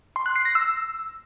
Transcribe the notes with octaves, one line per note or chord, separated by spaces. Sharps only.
C6
F#6
C7
A#6
E6